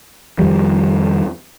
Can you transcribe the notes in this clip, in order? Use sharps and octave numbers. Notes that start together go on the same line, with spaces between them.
F2 D#3 F3 G3